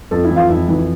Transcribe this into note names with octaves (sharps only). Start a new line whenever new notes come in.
F2 A4
E4 E5
E3
F4 F5
F2 E4 E5
E3